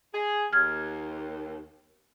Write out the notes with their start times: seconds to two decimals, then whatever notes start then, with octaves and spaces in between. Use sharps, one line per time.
0.12 G#4
0.53 D#2 F6 G#6